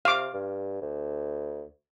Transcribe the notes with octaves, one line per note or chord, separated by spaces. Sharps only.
C3 F5 D6
G2
D2